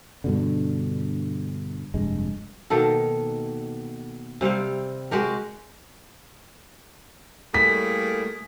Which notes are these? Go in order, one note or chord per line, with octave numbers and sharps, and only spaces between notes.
G2 B2 D3
F1 G2 G#3
B2 D#3 A#3 A4
C3 G3 C4 F5
G#3 F#4 G4 A#4
A2 G3 A3 A#3 G#4 B6